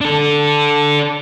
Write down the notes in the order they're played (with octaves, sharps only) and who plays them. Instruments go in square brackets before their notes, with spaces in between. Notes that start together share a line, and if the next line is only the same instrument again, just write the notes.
[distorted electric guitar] D4 A4